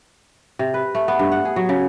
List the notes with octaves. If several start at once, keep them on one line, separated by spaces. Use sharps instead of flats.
C3
B4
A3
B3
G2
F#5
G#4
F#3
C#3